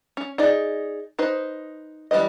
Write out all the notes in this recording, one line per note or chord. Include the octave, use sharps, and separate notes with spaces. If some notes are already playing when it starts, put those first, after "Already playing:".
C#4
D#4 G#4 D5
D#4 B4 C5
E3 G3 A4 B4 D#5